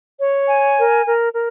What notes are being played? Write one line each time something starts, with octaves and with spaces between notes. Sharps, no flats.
C#5
G#5
A#4
A#4
A#4